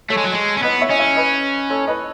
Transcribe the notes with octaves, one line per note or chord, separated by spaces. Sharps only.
A3 A4 C#5
G#3
F#3
G#3
C#4
B3 B4 D#5
C#5 E5
C#4 D#5
C#5 E5
B4 D#5
A4 C#5
B4 D#5